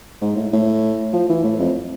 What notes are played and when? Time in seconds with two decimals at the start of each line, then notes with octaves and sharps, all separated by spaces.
0.21 G#2
0.36 A2
0.53 A2
1.13 F3
1.30 E3
1.44 A2
1.59 F2